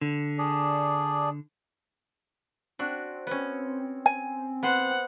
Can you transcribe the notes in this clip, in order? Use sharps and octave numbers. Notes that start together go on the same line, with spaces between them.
D3
D4 G#4 D5
C4 D4 F#4
B3 C#4
G#5
B3 C5 F#5